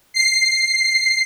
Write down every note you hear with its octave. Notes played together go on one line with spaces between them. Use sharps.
C7